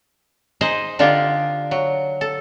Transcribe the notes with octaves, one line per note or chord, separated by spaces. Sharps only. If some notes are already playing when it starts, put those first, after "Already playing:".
D#4 G#4 C5 D#5
D3 D4 D#4 F4 G4
F#3
A4